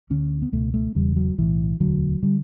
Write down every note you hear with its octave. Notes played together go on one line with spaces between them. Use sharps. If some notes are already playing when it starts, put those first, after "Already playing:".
D2 D3 C#4
B3
C#2 B2 A3
A3
E1 E2 C#3 G3
F#3
B1 A2 E3
E1 D2 D3 F#3
D3 G3